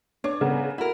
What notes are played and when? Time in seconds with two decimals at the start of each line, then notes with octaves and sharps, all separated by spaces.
0.24 D4 C#5
0.41 C#3 B3 A#4
0.78 E4 F#4 A#4